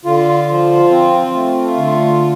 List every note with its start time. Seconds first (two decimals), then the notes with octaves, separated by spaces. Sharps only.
0.05 D3 F4
0.48 F3
0.91 C4
1.34 A3
1.77 D3